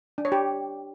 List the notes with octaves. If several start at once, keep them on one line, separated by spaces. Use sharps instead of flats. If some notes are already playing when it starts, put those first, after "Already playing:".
D4
C#5
G4